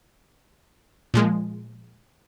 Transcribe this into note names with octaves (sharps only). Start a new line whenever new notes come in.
A#2 F3 G#3